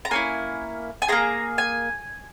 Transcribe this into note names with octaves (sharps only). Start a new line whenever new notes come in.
A#5
A#3 C#4 E4 G#5
G#5
A#3 C#4 G#4 A#5
G#5